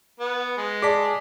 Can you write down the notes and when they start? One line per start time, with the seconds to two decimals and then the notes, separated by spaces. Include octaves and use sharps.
0.20 B3
0.57 G#3
0.82 G#4 D5 A5 D6 B6